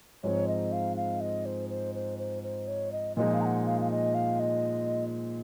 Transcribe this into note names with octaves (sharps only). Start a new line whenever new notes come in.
G#2 F3 G#3 C4 D#4 C#5
D#5
F5
F5
D#5
C5
C5
C5
C5
C5
C#5
D#5
A#2 F3 G#3 D#4 D#5
F5
A#5
F#5
F5
F5
D#5
F5
D#5